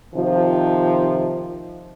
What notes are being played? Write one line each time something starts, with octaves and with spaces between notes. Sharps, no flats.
C3 D#3 F3